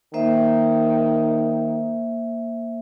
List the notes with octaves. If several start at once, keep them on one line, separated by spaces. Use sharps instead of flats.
D#3 A#3 C5 E5